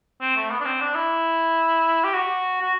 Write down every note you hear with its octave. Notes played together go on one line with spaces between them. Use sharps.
C4
A3
B3
D4
C4
D4
E4
G4
F#4
F#4